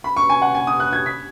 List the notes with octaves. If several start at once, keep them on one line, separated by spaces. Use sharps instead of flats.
B5
C#6
G#5
F#5
G#5
D#6
F#6
G#6
B6